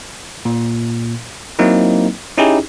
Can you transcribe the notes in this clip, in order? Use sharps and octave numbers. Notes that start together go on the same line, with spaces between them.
A#2
F#3 A#3 C4 D#4 E4
C#4 D#4 E4 G4 G#4